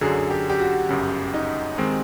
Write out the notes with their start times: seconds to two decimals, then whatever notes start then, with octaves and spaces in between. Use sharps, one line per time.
0.01 F#2 D3 F#3 G#4
0.30 G4
0.49 G4
0.60 F#4
0.89 G1 F#2 C#3
1.34 D#4
1.78 D#3 G#3 C4